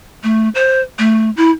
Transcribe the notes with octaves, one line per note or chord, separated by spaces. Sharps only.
A3
C5
A3
E4